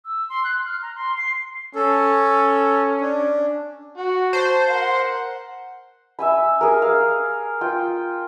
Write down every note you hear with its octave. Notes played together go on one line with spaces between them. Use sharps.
E6
C6
F#6
F6
A#5
C6
C7
C#4 A4
D4
F#4 F#5
C5 A5
A#4 F#5
E5 G#5 B5
G#4 A#4
F5
F4 G5